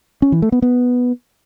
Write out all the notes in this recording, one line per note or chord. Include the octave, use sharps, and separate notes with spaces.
C#4
E3
A3
B3
B3